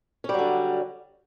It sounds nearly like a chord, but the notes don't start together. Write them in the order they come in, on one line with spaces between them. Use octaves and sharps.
C#4 G3 F#3 D3